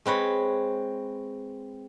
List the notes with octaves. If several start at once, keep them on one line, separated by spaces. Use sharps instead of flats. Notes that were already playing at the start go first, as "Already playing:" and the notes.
G#3 C4 B4 C#5